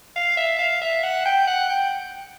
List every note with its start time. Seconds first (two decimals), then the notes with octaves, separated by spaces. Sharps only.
0.16 F5
0.37 E5
0.59 F5
0.82 E5
1.03 F#5
1.25 G5
1.47 F#5
1.69 G5